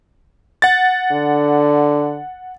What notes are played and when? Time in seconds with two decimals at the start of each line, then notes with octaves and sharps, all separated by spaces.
0.62 F#5 A6
1.11 D3